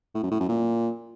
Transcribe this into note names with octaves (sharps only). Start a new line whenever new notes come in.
A2
F#2
A2
F#2
A#2